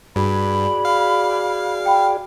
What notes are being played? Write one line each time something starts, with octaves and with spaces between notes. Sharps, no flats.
G2 F#4 G#4 D5 B5
F5
G5 B5